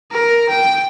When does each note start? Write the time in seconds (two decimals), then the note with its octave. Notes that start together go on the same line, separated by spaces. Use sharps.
0.12 A#4
0.49 G5